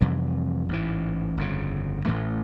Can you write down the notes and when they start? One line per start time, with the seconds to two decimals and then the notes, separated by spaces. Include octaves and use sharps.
0.01 F2 C3 E3 G3
0.69 A1 G#2 E3
1.37 G1 F2 C#3
2.06 A1 A2 E3 A3